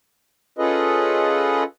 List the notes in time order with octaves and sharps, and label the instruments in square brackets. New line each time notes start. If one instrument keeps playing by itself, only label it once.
[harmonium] C#4 F4 G#4 A4 B4 D#5